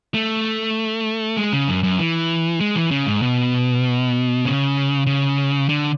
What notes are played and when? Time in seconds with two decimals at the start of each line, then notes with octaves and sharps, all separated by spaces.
0.14 A3
1.37 G#3
1.53 C#3
1.68 F#2
1.83 F#2
1.99 E3
2.61 G#3
2.76 E3
2.91 C#3
3.06 G#2
3.22 B2
4.45 C#3
5.07 C#3
5.69 D3